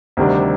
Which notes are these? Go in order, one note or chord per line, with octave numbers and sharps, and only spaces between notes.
D2 C3 D#3 G3 D4